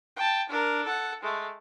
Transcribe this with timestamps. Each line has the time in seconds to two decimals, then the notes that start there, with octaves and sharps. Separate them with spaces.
0.16 G5 A5
0.49 D4 A#4
0.84 A4 F#5
1.23 G#3 A3